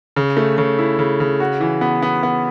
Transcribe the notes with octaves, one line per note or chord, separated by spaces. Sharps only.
C#3
A3
C#3
E4
C#3
C#3
F#4
E3
B3
B3
B3